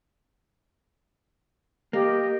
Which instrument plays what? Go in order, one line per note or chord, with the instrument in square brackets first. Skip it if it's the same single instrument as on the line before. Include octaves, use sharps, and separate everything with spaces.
[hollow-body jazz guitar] A#3 [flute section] G4 D#5